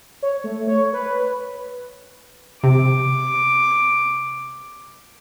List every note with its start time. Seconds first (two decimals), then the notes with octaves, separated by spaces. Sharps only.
0.23 C#5
0.44 A3
0.67 C#5
0.93 B4
2.63 C3 D6